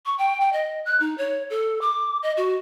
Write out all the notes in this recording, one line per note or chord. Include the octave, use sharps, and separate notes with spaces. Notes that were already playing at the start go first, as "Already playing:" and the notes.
C#6
G5
G5
D#5
F#6
D#4
C#5
A4
D6
D#5
F#4